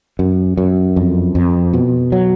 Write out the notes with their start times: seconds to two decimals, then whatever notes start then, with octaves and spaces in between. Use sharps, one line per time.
0.19 F#2
0.57 F#2
0.96 F2
1.35 F2
1.73 B2
2.12 F#3